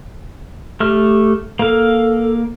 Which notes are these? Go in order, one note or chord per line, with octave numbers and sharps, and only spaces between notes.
A3 G4 F6
A#3 A4 F5